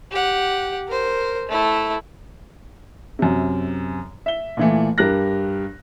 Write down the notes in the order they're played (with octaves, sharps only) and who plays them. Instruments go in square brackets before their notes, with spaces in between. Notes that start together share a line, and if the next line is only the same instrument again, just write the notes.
[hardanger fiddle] G4 F#5
A#4 C5
A3 E4
[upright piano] F#2 C3
E5 G7
A#2 E3 A3
G2 G4 A#4 F#6 A#6